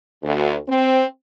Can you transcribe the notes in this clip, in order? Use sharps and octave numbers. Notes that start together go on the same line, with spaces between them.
D2
C4